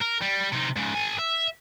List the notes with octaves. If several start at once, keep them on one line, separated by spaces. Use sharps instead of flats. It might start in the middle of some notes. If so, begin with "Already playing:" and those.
A#4
G3
C3 D#4
G#2 C#3
A4 G#5
E5